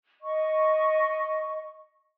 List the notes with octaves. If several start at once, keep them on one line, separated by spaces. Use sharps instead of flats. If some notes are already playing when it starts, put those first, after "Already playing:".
D#5 C#6